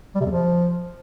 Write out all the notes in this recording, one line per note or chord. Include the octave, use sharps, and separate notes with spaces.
G3
C3
E2
F3